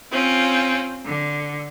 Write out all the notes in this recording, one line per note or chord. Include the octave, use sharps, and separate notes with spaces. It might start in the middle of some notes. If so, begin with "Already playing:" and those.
C4 C#4 F4
D3